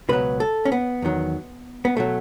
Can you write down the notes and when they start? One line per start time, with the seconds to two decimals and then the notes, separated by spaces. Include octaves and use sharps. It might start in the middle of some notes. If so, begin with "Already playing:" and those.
0.09 C#2 B2 F#3 B4
0.40 A4
0.65 C#4
0.72 B3
1.02 E2 D#3 F#3
1.85 B3
1.97 B2 F#3 A3